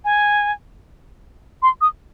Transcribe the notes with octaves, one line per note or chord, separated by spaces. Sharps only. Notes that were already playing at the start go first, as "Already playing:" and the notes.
G#5
C6
D#6